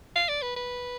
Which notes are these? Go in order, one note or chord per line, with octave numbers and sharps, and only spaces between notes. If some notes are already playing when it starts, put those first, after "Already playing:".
F5
D5
B4
B4